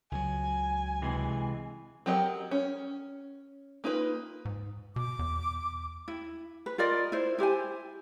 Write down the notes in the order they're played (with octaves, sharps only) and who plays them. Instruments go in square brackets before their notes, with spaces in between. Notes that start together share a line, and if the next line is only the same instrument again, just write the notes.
[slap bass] C#2 F#3 [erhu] G#5
[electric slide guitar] C3 E3 G#3
[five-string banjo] F#3 C4 G4 A#4 D#5
C#4
A#3 D#4 F4 B4
[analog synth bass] G#2
[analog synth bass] B2 [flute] D6
[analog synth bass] E2
[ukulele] E4
B4
F4 A#4 D5 D#5
E4 C5
E4 G4 C5 G#5